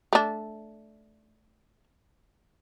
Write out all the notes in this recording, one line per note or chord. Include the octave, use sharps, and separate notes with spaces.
A3 D4